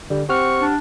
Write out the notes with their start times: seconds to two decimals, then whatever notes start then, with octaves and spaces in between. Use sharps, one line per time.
0.10 D3 G3
0.29 C4 G4 F#5 C#6 F6
0.61 D4